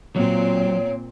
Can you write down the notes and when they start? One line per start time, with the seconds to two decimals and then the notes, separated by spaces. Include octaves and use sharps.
0.16 A#2 F#3 C4 C#5